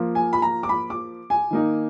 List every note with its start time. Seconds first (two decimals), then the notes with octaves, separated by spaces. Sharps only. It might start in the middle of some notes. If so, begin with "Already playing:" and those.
Already playing: F3 A#3 F4
0.15 G#5
0.33 B5
0.42 A#5
0.63 D6
0.69 B5
0.90 D6
1.30 G#5
1.51 D#3 A#3 D#4